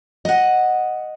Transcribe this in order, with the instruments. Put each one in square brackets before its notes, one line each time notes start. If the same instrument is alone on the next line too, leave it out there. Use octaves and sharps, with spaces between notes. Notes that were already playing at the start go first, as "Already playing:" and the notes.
[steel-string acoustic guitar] D#5 F#5